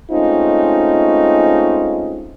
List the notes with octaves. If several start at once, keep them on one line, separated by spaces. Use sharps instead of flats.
G#3 A3 C4 C#4 D#4 F4